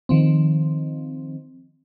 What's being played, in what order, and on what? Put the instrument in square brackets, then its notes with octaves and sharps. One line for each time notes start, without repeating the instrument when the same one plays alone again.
[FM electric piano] D#3 F3 C4